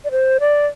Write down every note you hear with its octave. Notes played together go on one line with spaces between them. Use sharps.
D5
C5
D5